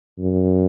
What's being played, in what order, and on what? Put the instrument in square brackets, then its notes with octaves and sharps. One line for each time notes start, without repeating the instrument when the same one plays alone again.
[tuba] F#2